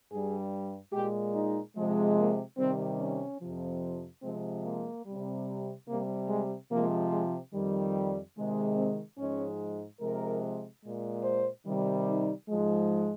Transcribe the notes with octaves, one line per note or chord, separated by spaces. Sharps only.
G2 G3 G#4
A#2 G#3 G4
D#4
C3 F3 G#3
A#3
C3 D#3 G3 C4
C#4
F2 C3 F3
C3 F3 G#3 C4
A#3
C3 G3
C3 G3 A#3
G#3
C3 F3 G#3 A#3
G#3
F2 D#3 G3
C3 D#3 G#3
C4
G#2 F3 G#3 C#4
C3 F3 G#3 A#4
A#2 G#3
C5
C3 D#3 G3
D#4
G#2 F3 G#3